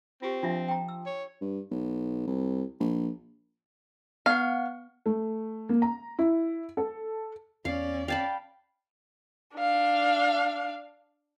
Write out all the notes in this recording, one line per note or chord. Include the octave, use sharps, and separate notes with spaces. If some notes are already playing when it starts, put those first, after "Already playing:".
C4 F4 G4
F3 D4 F4 E5
G5 A#5
E6
C#5
G2
B1
C2
A#1
B3 F5 F#5
A3
A#3
A#5
E4
A4
E2 B3 C#4 D5 F5
F5 G5 A5 B5
D4 F5